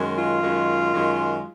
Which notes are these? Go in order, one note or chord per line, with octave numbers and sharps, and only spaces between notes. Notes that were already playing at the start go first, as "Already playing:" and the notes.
Already playing: F#2 D#3 G#3
F4
F#2 D#3 G#3
F#2 D#3 G#3